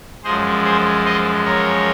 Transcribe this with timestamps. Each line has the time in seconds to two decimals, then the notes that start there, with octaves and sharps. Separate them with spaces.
0.24 F#2 F3 G#3 G#4 C5
0.64 G#4 C5
1.05 C5 D#5
1.45 A#4 C#5